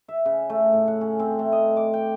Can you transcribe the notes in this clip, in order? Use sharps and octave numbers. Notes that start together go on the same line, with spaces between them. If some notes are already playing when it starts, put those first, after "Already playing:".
E5
C#3
A3
A2
F#5
C#4
C4
A3
D#5
D6
G5